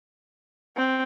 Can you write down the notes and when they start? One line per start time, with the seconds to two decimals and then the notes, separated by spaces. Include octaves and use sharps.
0.76 C4